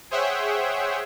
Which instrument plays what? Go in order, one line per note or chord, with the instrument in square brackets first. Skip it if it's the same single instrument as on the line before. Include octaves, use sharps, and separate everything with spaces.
[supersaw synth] G#4 C5 C#5 E5 F#5 G5